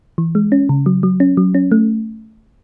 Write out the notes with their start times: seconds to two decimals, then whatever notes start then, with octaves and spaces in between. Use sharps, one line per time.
0.18 E3
0.35 G#3
0.52 C#4
0.69 C#3
0.86 F#3
1.03 F#3
1.20 C#4
1.37 F#3
1.54 C#4
1.72 A3